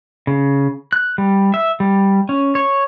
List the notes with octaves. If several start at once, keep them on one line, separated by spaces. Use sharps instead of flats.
C#3
F#6
G3
E5
G3
C#4
C#5